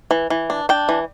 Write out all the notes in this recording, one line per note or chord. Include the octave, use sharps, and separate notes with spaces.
E3
E3
D4
D4 G5
E3